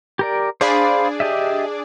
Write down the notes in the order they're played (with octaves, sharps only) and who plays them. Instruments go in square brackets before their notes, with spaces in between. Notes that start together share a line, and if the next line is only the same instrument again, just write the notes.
[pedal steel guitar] G4 A#4 D5
[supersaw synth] D4 G#4 D5 [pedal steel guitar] C5 F5 B5
[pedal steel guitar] G4 D#5 E5